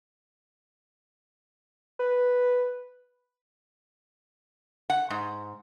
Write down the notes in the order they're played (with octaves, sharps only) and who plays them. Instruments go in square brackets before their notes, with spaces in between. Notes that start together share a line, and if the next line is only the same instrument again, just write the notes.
[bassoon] B4
[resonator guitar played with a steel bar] F#5
G#2